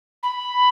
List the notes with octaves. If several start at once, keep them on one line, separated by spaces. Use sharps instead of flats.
B5